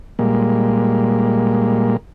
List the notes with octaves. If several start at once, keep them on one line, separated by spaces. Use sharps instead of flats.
A#2 G3 G#3 A#3